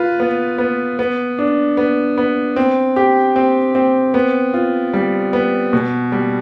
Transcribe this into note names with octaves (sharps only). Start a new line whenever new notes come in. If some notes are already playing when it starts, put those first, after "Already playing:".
Already playing: F4 B4
B3
B3
B3
D4
B3
B3
C4
G4
C4
C4
B3
F4
G3
B3
B2
G3